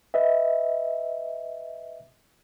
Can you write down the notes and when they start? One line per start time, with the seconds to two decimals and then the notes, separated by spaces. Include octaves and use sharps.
0.14 B4 D#5 E5